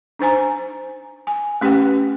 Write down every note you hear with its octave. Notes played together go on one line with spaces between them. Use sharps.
D4 D#4 C5 G#5 A#5
G#5
A3 C#4 G4 B4 F#5 G5